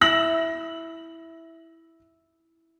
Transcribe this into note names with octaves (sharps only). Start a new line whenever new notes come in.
E4 E6 A#6 F#7